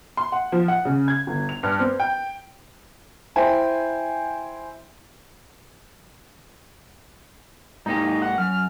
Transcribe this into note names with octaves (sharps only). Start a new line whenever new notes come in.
C6
F#5
F3
F#5
C#3
G#6
G1
F7
G2
C4
G5
E4 C5 G5 G#5
G#2 A#3 D#4 G4
F#5
F#2 F6